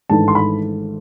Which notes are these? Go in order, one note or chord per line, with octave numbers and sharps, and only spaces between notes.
G#1 G#2 E3 A3 D4 A5
C6
B5